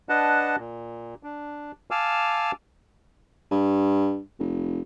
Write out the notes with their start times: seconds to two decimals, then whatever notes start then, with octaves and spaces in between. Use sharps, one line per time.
0.09 D4 B4 D#5 F#5 A5
0.58 A#2
1.23 D4
1.91 F5 G#5 A5 D6 E6 F6
3.51 G2
4.39 F1